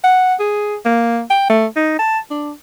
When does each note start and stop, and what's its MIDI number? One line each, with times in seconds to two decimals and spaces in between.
0.04 0.34 78
0.39 0.76 68
0.85 1.22 58
1.30 1.45 79
1.49 1.66 57
1.76 1.96 63
1.99 2.19 81
2.30 2.52 62